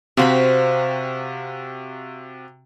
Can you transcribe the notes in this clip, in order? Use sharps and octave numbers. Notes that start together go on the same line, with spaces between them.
C3 C4 F#4 C5 F5 B5